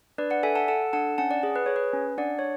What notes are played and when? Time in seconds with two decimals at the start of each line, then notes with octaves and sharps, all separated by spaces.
0.18 D4 B4 D5
0.30 D5 F#5
0.43 A4 E5 G#5
0.55 F#5 A5
0.68 A4 F#5 A5
0.93 D4 F#5 A5
1.18 C#4 F#5 A5
1.31 D5 F#5
1.43 G#4
1.56 B4
1.66 G#4 C#5
1.76 B4
1.93 C#4
2.18 D4 D5 F#5
2.39 C#5